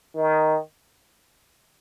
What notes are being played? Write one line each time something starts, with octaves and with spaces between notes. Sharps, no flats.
D#3